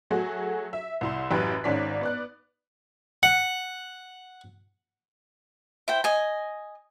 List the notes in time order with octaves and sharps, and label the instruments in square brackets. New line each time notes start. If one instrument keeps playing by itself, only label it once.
[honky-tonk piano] F#3 A3 F#4 G#4
E5
C2 E4 C6
A1 F#2 G4 B4 F#6
G#1 G#2 C#4 D5 B6
B3 D5 F#6
[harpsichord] F#5 [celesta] C#7
[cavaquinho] E4 C5 G5
D#5 G#5